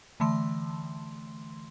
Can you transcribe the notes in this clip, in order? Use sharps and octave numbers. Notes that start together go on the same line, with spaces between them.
D3 E3 A3 C6